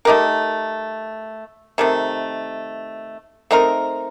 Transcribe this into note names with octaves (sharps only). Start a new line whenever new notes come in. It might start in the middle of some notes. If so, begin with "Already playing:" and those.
A3 D#4 G4 A#4
C3 D#3 A3
A3 C4 D#4 A#4